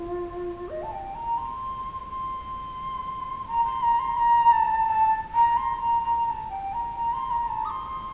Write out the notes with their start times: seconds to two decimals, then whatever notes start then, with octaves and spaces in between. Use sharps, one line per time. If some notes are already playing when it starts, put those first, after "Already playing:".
Already playing: F4
0.69 D#5
0.82 A5
0.92 G5
1.14 A#5
1.37 C6
2.08 C6
3.47 A#5
3.64 C6
3.82 A#5
3.99 C6
4.16 A#5
4.52 A5
4.87 A5
5.33 A#5
5.57 C6
5.79 A#5
6.02 A#5
6.25 A#5
6.29 A5
6.48 G5
6.73 A#5
6.95 A#5
7.13 C6
7.30 A#5
7.48 A5
7.64 D#6
7.69 C6